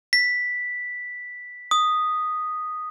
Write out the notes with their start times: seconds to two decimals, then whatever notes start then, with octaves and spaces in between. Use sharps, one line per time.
0.13 B6
1.71 D#6